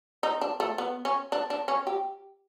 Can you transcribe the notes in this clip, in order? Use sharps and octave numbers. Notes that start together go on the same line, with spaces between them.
D#4
D4
A3
B3
C#4
D4
D4
C#4
G4